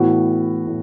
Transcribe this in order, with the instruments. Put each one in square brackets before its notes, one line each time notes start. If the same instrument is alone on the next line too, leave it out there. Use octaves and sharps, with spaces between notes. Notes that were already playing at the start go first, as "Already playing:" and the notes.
Already playing: [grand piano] A2 E3 B3 F#4
A2